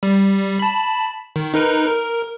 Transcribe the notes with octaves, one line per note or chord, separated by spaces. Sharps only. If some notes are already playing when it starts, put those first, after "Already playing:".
G3
A5 B5
D#3
D#4 A#4 B4
A#4